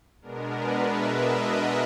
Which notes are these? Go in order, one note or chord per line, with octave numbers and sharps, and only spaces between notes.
B2 G#3 B3 D4 A#4
B4
E5
D#5